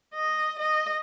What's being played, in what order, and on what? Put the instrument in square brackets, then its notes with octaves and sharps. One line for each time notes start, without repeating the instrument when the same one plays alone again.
[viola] D#5
D#5